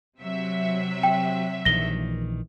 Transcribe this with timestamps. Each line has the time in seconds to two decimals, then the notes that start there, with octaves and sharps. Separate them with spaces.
0.19 C3 F#3 E5
1.03 G5
1.65 A#1 D#3 E3 A#6 G7